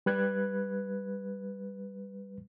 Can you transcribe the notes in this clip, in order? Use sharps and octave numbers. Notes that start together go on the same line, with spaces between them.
G3 B4 F#6 G#6